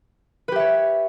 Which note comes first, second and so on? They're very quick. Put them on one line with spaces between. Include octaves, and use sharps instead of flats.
B4 G4 E5 C#5